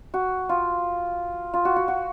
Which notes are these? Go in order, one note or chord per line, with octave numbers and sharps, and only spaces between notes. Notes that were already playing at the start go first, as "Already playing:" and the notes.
F#4
F4
F4
F#4
F#4
F#4